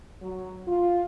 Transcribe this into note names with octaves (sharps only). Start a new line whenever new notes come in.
F#3
F4